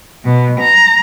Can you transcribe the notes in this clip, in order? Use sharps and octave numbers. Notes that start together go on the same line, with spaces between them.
B2
A#5